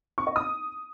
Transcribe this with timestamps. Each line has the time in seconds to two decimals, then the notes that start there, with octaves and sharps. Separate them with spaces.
0.18 C#6
0.27 D#5
0.36 D#6